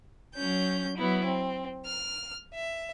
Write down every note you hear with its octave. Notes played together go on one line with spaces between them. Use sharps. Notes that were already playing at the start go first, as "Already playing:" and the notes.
F#3 C#4 G6
F#3 B3 E4
C4
F6
E5